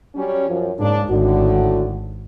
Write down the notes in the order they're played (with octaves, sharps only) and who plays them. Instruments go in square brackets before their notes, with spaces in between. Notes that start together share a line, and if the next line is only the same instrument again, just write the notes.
[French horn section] F#3 G3 C#4
[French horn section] F#2 [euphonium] F3
[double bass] G#2 [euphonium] C#3 [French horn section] A#3 D4
[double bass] G#1 [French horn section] A2 D3 [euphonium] F#4